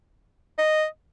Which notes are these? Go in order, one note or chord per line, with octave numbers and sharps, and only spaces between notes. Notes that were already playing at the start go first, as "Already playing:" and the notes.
D#5